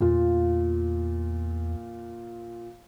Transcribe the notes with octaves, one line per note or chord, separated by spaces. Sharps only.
E2 A#2 F4